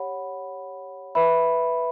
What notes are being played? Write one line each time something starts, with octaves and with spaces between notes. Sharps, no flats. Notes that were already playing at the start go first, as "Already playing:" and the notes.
Already playing: G4 C#5 F#5 B5
B4 E5 B5